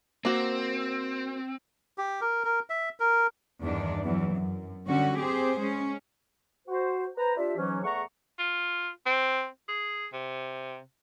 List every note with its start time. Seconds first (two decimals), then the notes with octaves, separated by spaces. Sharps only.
0.25 A#3 C4 F#4
1.98 G4
2.21 A#4
2.44 A#4
2.70 E5
3.00 A#4
3.62 E2 G2 D#3 D4
4.04 E2 E3 F#3
4.36 F#2
4.87 D3 G3 C#4 F#4
5.19 C4 G4 G#4 C5
5.61 G#3 C#4
6.68 F#4 C5
7.17 B4 C5 A#5
7.37 D4 F4 G4 E5
7.57 G#2 E3 F#3 C#4
7.84 E2 A3 G#4 F#5 A#5 C#6
8.39 F4
9.06 C4
9.68 G#4
10.13 C3